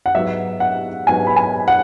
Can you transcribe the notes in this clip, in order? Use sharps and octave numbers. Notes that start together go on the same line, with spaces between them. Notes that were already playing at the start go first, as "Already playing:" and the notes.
F#5
G#2 F#3 B3 E5
F#5
G#2 F#3 B3 G#5
B5
G#5
F#5